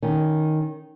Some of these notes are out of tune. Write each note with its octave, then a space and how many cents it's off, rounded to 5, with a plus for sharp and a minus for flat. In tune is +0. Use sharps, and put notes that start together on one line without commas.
D#3 +0 C#4 +10